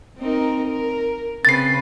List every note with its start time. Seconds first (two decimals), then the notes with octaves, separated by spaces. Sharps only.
0.18 C4 D#4 A#4
0.67 A#4
1.45 C#3 C4 B4 A6 C7